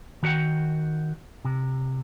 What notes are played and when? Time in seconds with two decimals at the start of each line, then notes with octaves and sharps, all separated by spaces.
0.23 D#3 F#4 D5 F#5 G5
1.45 C3